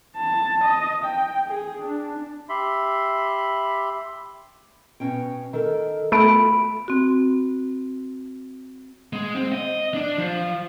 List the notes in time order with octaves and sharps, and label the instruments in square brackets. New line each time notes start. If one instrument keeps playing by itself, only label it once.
[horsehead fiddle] A5
D#5
G5
G#4
D4
[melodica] G4 E5 B5 C6
[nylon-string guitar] B2 C#4 G5
D#3 A4 A#4
[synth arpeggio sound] A3 D7 [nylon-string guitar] B3 F4 F#4 [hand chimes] B5
[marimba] C4 F#4
[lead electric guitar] G#3
C4
D#5
D4
F3